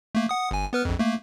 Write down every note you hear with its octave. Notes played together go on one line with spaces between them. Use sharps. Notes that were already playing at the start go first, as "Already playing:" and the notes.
A3 A#3
F#5 D#6
G1 G#5
B3 B4 F6
A#1 F2
A3 A#3